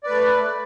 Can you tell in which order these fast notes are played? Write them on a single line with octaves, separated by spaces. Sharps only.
D5 B4 A3